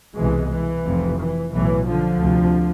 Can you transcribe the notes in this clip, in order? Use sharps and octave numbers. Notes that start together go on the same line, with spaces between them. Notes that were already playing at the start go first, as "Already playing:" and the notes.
C2 B2 E3 G#3
E3
F1 F2 C3
E3
B1 A2 E3
D3 F3
D2 C3